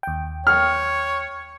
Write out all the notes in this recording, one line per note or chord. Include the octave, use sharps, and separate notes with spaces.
D#2 G5
C#5 F6